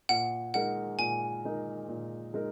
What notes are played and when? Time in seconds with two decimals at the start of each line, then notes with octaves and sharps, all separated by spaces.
0.09 A#2 F#5
0.54 G#3 D#4 A#4 F#5
0.99 A#2 G#5
1.45 G#3 D#4 A#4
1.88 A#2
2.34 G#3 D#4 A#4